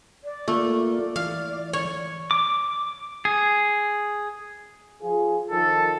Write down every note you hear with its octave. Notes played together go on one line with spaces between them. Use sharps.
D5
A3 A#3 F4
D5
E3 F5
C#5
D6
G#4
F3 F4 G#4
D#3 F3 A4